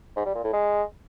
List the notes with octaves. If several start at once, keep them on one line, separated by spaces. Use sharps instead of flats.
G#2
G3
A#2
A2
G#3